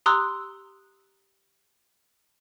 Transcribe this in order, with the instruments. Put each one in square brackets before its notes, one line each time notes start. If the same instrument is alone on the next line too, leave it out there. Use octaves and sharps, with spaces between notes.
[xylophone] G4 A#5 C6 D#6 E6 F#6